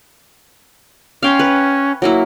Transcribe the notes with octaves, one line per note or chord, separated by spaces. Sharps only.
C#4 F5 G5 C6
B4
F#3 A#3 E4